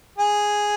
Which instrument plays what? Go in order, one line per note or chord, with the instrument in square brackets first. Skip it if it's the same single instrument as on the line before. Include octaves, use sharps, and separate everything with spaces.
[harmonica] G#4